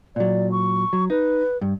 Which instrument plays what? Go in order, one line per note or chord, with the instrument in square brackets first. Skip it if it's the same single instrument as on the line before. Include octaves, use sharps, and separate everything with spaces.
[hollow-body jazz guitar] A#2 F#3 [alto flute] D5
[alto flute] C#6
[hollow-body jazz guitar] F#3
[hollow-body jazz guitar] D#4 [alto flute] B4
[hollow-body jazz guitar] G2